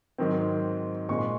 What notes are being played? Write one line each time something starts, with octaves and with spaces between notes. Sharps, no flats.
G#2 D#3 F#3 C4
A#2 G#3 C4 C#6
C6